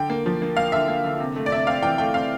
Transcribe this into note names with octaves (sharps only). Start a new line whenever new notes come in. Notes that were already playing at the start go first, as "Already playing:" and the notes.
Already playing: D3 G5
A#3
F3
A#3
A#3 F5
D3 E5
A#3
D3
C3
A3
D5
C3 E5
C4 F5
E3 G5
A3 G5
C4 F5